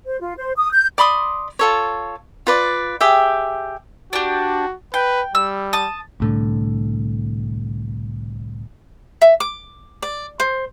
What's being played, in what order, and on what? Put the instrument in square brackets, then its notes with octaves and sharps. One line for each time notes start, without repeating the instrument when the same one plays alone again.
[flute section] C5
F4
C5
D#6
G6
[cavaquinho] D5 B5 C6 D#6
F4 A4 C#5
F4 B4 D5
G4 G#4 E5 G5
[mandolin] D4 G4 [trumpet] F#4
[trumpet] B4 [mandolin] G5
[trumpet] G3 [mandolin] E6
[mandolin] A5 D#6
[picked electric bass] C2 A2 D3
[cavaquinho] E5
D6
D5
C5